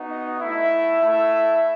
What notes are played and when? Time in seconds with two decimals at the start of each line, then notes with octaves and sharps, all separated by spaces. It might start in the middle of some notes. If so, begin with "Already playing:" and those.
Already playing: B3 D#4 F#4
0.11 D#5
0.40 A3 E4 E5
0.99 A3 E4